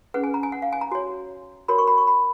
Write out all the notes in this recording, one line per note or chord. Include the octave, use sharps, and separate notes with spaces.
C#4 G#4 B4 F#5
G#5
A#5
G#5
F#5
F5
G#5
A#5
F#4 C#5
F#4 A#4 C#5 B5
C#6
B5
C#6
B5